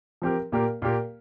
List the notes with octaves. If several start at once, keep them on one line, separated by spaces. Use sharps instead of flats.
F3 C4 G4 A#4
A#2 A#3 G4 A#4
A#2 A#3 G4 A#4